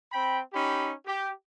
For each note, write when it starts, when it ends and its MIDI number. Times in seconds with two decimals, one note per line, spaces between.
0.12 0.40 60
0.12 0.40 79
0.12 0.40 83
0.53 0.92 61
0.53 0.92 63
0.53 0.92 67
0.53 0.92 83
1.06 1.30 67